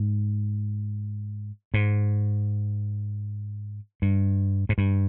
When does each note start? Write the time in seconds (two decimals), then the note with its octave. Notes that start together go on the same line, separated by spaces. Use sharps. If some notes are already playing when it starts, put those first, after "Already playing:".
Already playing: G#2
1.74 G#2
4.02 G2
4.69 G#2
4.78 G2